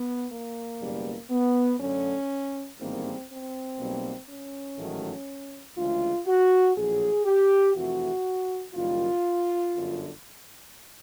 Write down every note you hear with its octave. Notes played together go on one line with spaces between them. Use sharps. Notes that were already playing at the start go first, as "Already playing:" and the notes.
Already playing: B3
A#3
F#1 E2 B2 G3
B3
F#2 D3 F#3 A3 C#4
A1 G#2 D#3 G3 A#3 C4
C4
B1 B2 G3 A#3
C#4
A1 G#2 D#3 F#3 A3
D2 C#3 E3 G#3 F4
F#4
A#1 A2 F#3 G#4
G4
F2 C3 E3 A3 F#4
F#1 F#2 D#3 G3 A#3 F4
G1 F#2 D3